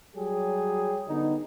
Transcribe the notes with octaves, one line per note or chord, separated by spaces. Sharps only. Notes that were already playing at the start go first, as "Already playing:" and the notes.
F#3 G3 G4 G#4
D3 B3 D#4